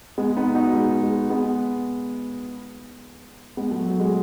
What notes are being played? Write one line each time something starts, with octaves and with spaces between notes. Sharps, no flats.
G#3 B3
B3 D#4
D#4 F#4
G#3
G#3
G#3 B3
G#3 B3
F#3 A3
F#3
G#3